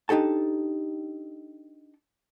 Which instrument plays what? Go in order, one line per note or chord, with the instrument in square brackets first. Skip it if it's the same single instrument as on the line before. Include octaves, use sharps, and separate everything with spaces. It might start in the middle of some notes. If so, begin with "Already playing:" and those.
[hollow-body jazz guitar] D4 D#4 G4 A4 A5